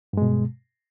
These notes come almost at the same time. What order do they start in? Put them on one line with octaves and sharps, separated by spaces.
G2 G#3 B2